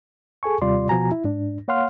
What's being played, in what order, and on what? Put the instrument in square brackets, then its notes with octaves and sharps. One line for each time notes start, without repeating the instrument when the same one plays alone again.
[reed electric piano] G#4 A4 G#5 C#6
D#2 C3 G3 F4 D5 C6
B2 F3 F#4 G#5 A#5
E4
G#2 D4
A#3 C#5 F5 F#5 C6 F6